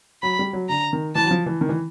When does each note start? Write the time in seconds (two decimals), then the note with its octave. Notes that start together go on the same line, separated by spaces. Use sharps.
0.22 F#3 B5
0.39 G3
0.53 F#3
0.69 D3 A#5
0.93 D#3
1.15 E3 A5
1.24 F#3
1.31 F3
1.46 E3
1.61 D#3
1.69 E3